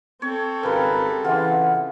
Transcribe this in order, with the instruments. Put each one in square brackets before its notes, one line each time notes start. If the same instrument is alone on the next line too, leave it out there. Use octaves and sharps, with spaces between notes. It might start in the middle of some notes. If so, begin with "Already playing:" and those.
[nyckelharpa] C4 A4 [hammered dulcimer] C#5
[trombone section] G#1 A#4 B4 [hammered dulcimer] C#3 G3
[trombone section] C#3 E3 [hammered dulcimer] F4 [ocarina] F#5